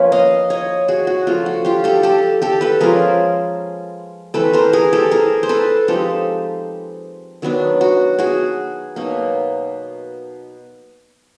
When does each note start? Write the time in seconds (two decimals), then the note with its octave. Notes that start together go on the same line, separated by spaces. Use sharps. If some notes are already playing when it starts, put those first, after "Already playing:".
Already playing: F3 A#3 C#4 F4 B4 C#5
0.12 D#5 F5
0.50 C#5 D#5
0.88 F#4 G#4
1.07 F#4
1.27 C#3 F3 A3 D4 F4
1.46 F#4
1.65 F4 G4
1.84 G4 A4
2.03 G4 A4
2.42 G4 A4
2.61 A4 B4
2.81 F3 G#3 C#4 F4 G#4 A#4
4.34 E3 A3 C4 A4 B4
4.53 A#4 C5
4.73 G#4 A#4
4.93 G4 A4
5.11 G#4 A#4
5.43 C5
5.49 A4 B4
5.88 F3 G#3 C4 D#4 G4 A4
7.42 D#3 F#3 B3 D4
7.81 F#4
8.19 F#4 G#4
8.96 B2 F#3 A#3 D#4